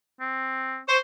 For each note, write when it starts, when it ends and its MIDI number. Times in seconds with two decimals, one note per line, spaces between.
0.21 0.80 60
0.88 0.98 72
0.88 0.98 85